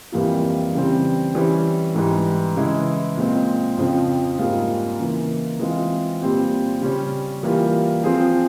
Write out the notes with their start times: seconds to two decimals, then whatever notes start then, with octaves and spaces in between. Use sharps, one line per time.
0.12 F2 E3 G3 A#3 F4
0.73 C#3 E3 G3 C4
1.35 E3 G3 C#4
1.95 G#2 E3 G3
2.56 C#3 E3 G#3 E4
3.17 A#2 G#3 C4
3.78 F2 C#3 F3 C4
4.38 G#2 G3 A#3 F4 G#4
4.99 C#3 E3 A#3
5.60 E3 G#3 C4 F4 G#4
6.21 A#2 G3 C4 G4
6.81 C#3 G3 C#4
7.43 E3 G3 A#3 F4
8.04 F3 C4 F4 G#4